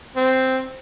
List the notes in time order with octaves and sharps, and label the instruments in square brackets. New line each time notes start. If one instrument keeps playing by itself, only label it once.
[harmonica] C4